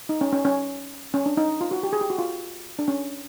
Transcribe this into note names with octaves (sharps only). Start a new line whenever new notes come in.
D#4
C#4
C#4
C#4
C#4
D4
D#4
F4
F#4
G4
G#4
G4
F#4
F4
D4
C#4